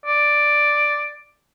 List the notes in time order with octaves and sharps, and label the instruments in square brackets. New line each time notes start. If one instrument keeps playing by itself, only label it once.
[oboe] D5